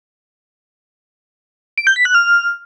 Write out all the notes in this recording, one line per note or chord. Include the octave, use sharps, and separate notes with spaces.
D7
G6
B6
F#6
F6